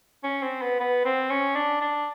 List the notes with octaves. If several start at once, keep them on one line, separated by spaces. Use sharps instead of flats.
C#4
C4
B3
B3
C4
C#4
D4
D4